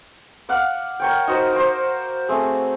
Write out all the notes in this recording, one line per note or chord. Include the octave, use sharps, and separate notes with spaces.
D5 F5 F#5
A#4 C#5 G5
D#4 F#4 C5
C5 D6
A3 C4 G#4